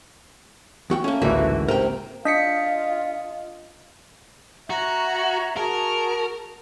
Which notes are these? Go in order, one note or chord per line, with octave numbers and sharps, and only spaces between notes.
E2 F#4 G5
A3 A#3 C#4
A1 D2 G#2 C#3 E3 A#3 F#4 E5
C3 A#4 G5
D4 F4 D#5 B6 C#7
F#4 C#5 E5 A#5
F#4 G#4 A#4 A5